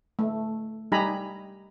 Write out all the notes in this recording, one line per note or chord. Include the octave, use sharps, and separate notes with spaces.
A3
G3 D#4 G4 G#5 A#5 B5